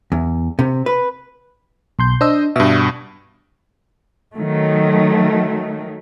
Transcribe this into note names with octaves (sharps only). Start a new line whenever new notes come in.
E2
C3
B4
B1 C6 G6
D4 C5 D#5 E6
G2 B2 E5
D#3 F#3 A3